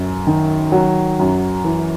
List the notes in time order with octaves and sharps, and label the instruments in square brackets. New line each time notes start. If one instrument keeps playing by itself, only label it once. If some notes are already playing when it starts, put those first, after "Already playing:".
Already playing: [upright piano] F#2
D#3
F#3
F#2
E3